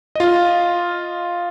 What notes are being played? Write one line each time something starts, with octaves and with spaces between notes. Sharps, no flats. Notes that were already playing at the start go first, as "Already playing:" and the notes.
F4 D#5